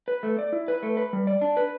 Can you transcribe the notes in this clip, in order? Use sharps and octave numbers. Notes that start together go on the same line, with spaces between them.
B4
A3
D5
E4
B4
A3
B4
G3
D5
D4
B4